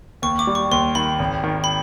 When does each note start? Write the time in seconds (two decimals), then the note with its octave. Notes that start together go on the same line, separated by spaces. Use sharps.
0.22 D#2 C#6
0.39 D6
0.47 G3
0.55 C#6
0.71 D#2 C6
0.95 D#3 B5
1.19 G#1
1.44 D#3
1.64 B5